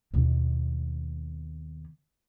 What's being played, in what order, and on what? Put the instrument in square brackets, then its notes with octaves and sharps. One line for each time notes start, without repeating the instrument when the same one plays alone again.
[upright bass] D#2 B2